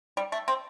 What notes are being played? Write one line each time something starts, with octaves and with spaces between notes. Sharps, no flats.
G3
A3
C4